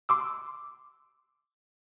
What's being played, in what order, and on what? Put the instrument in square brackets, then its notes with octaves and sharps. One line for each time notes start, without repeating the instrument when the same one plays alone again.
[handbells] C6 D6 E6